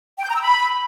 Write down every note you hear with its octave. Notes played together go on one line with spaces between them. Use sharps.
G5
G6
A#5
E6
B5